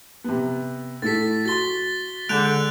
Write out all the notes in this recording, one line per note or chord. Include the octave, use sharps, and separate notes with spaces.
C3 B3
A2 A4 A6 B6
F#4 C6 A6 G7
D3 G#3 F#6 G6 D7 E7 F7